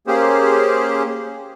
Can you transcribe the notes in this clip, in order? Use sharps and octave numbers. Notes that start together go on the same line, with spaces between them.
A#3 C#4 G4 G#4 C5